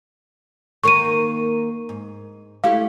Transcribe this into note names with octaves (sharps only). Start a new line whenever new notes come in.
D#3 A#3 A#4 C#6 D#7
G#2
A3 E4 G4 F5